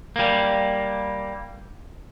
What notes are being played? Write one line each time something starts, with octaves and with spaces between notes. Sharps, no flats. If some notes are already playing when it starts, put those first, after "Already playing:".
G3 A#3